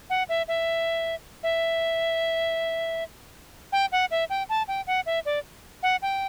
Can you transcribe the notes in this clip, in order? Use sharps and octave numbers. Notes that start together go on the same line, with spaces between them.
F#5
E5
E5
E5
G5
F#5
E5
G5
A5
G5
F#5
E5
D5
F#5
G5